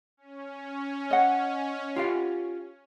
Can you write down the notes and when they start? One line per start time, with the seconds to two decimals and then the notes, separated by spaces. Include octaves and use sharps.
0.17 C#4
1.11 D#5 F#5
1.96 F4 G4 F5